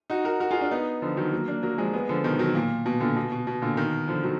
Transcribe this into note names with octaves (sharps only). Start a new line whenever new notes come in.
D#4 F#4
F#4 A#4
F#4 A#4
F4 G#4
D4 F4
B3 D#4
D3 F3
D#3 F#3
F#3 A#3
A#3 D4
F#3 A#3
F3 G#3
G#3 B3
D3 F3
B2 D#3
D#3 F#3
A#2
B2
A#2 D3
B2
B2
B2
A#2 D3
B2 D#3
D3 F3
D#3 F#3